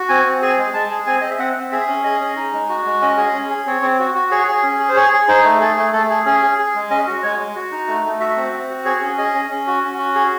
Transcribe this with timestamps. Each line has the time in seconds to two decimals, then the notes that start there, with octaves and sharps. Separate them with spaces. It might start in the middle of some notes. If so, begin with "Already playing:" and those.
Already playing: F#4
0.09 C4 G#5
0.26 C4
0.42 G#4 G#5
0.58 G#3
0.74 G#3 A5
0.91 G#4
1.07 C4 G#5
1.21 C4 D#5
1.31 E5
1.39 C4 F#5
1.56 C4
1.72 G#4 E5
1.87 C#4
2.04 G#4 D#5
2.20 C#4
2.36 D#4
2.53 G#3
2.69 F#4
2.85 G#3
3.02 C#4 D#5
3.17 G#4
3.34 C#4
3.50 G#4
3.67 C4 C#5
3.82 C4
3.99 F#4
4.15 F#4
4.31 G#4 C#5
4.48 G#4
4.63 C#4
4.79 G#4
4.89 C5
4.96 G#4 C#5
5.13 G#4
5.28 D#4 C5
5.44 A3
5.61 G#4 A4
5.77 A3
5.93 A3 A4
6.10 G#4
6.25 C#4 G#4
6.43 G#4
6.59 G#4
6.75 G#3
6.90 C#4 D#5
7.07 F#4
7.23 G#3 C#5
7.39 G#3
7.56 F#4
7.71 D#4
7.88 A3
8.05 A3
8.20 F#4 E5
8.36 C4
8.53 C4
8.70 F#4
8.85 G#4 C#5
9.02 C#4
9.18 G#4 D#5
9.34 C#4
9.50 C#4
9.67 F#4
9.83 C#4
9.98 F#4
10.15 G#4